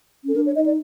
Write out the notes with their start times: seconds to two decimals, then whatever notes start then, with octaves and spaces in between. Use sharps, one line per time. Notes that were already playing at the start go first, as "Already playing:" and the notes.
0.24 C#4 A4
0.35 D4 A#4
0.46 C#5
0.56 D#4 D#5
0.66 D5